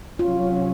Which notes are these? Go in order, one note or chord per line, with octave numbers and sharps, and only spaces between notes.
C3 F#3 C#4 F4